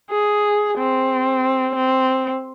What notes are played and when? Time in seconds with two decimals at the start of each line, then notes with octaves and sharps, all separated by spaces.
0.11 G#4
0.78 C4
1.75 C4